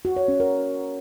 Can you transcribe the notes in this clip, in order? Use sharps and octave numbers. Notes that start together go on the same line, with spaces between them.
F#4
C#5
C#4
A#4